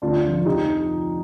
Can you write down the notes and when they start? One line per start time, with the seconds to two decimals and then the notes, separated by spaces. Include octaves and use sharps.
0.02 D2 D4 F4
0.24 D3 F3
0.46 F1 D#4 G4